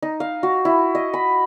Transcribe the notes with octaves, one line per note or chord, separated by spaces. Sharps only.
D#4
F5
F#4
E4
D#5
B5